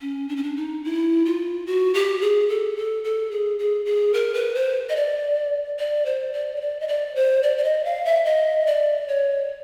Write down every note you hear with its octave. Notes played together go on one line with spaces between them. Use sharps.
C#4
D4
C#4
D4
D#4
E4
F4
F#4
G4
G#4
A4
A4
A4
G#4
G#4
G#4
A#4
B4
C5
D#5
D5
D5
C5
D5
C#5
D5
D#5
D5
C5
D5
D5
D#5
F5
E5
D#5
D5
C#5